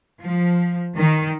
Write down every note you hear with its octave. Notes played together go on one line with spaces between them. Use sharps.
F3
D#3